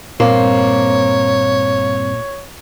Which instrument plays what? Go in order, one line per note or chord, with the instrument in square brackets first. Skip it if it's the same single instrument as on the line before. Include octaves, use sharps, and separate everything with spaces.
[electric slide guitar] G2 C4 C5 [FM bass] A#2 [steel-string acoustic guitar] A#3 [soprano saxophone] C#5